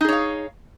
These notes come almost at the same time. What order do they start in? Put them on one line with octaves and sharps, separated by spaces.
D#4 G#4 C#5 F5